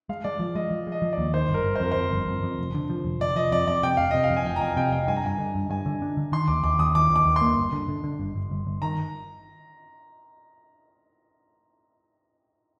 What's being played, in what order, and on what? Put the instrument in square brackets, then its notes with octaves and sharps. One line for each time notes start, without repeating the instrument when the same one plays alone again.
[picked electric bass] G#3 [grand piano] F5
[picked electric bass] G#3 [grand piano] D5
[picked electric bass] F3
[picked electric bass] G#3 [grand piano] D#5
[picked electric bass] F3
G#3
[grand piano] D#5
[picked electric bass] F3
[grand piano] D5
[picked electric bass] D#2
[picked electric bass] D#3 [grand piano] C5
[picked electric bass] G1
[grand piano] A#4
[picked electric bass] G1
[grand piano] C5
[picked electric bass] F2 [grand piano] A#4
[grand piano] C5
[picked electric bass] F2
G1
F2
F2
F1
D3
F3
F1
[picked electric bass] F1 [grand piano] D5
[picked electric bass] F3 [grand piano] D#5
[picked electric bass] F2 [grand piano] D5
[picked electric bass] F2 [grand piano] D5
[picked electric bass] C3 [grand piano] G5
[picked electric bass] F1 [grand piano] F5
[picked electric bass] C3 [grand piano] D#5
[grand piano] F5
[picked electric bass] F2
[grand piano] G#5
[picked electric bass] F1 [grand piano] G5
[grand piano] A#5
[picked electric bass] F2 [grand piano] G#5
[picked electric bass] C3 [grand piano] G5
[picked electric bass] F1 [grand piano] G5
[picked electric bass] G2 [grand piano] G#5
[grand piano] A#5
[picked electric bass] G2 [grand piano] G#5
[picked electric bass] D3
G2
[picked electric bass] G2 [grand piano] G#5
[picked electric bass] D3
D4
D3
[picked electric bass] D#3 [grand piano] C6
[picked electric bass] D#2 [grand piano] D6
[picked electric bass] D#2 [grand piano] D6
[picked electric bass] D#2 [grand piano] D#6
[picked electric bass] D#3 [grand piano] D6
[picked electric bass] D#2
[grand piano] D6
[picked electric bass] D#2
[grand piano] C6
[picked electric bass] A#3
G1
D3
D3
D3
G1
G1
G1
G1
[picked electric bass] D#3 [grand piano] A#5